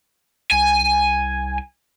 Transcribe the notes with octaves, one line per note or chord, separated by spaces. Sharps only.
C2 G#5